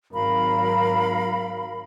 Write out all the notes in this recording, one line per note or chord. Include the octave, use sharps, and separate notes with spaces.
G#1 F#3 A#4 F5 B5